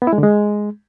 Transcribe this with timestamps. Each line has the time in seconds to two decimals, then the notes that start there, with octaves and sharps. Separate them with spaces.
0.02 B3
0.07 E4
0.13 G#3
0.18 D3
0.23 G#3